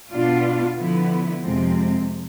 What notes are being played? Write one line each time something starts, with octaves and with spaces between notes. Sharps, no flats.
B2 B3 D4 F4
D3 F3 B3 E4
F2 C3 F3 G#3 C4